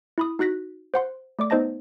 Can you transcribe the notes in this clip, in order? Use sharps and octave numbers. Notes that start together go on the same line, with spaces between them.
E4 B5 D#6
D#4 F#4 F#6 A#6 B6
C5 F#5 C6
A3 D5 D6
B3 D#4 C5 D#5 A5 A#6